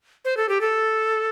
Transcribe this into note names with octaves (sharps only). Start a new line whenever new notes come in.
C5
A4
G4
A4